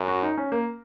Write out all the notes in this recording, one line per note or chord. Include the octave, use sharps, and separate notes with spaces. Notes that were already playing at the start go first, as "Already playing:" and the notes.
Already playing: F#2
F#4
D#4
C#4
A#3